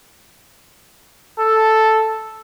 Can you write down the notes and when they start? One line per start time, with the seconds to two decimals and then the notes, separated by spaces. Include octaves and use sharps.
1.40 A4